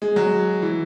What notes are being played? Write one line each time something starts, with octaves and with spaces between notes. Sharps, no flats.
G#3
F#3
E3